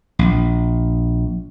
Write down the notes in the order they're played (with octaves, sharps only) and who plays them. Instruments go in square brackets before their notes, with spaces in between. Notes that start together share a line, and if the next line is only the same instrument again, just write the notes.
[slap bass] A#1